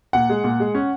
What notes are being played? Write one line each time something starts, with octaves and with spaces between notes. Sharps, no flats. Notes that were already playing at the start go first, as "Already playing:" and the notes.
A#2 F#5
G#3
A#2
G#3
C#4